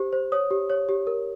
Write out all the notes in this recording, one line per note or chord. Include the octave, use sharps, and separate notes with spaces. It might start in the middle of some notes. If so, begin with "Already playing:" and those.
Already playing: G4 C5
C5
C#5 D#6
G4
C#5
G4
A#4